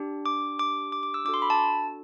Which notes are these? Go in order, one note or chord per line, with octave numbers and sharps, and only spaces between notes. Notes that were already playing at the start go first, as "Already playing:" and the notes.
Already playing: D4 G4
D6
D6
D6
D6
E6
D4 F#4 A4 D6
C6
B5
A5